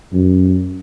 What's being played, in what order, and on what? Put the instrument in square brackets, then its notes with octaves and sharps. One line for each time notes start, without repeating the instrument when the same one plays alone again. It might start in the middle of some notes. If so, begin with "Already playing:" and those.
[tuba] F#2